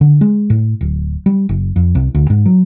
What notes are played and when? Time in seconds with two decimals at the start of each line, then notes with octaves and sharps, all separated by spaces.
0.01 D3
0.21 G#3
0.50 A2
0.81 D1
1.26 G3
1.49 F#1
1.76 F2
1.95 C2
2.15 D2
2.30 G#2
2.46 F#3